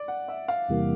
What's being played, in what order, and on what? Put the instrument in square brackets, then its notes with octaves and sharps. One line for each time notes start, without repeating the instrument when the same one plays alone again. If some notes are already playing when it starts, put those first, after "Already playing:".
Already playing: [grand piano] D5
F#5
E5
F5
[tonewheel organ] E2 C3 E3 G3 A#3